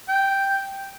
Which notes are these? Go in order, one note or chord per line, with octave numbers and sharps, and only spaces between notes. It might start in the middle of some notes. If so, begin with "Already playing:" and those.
G5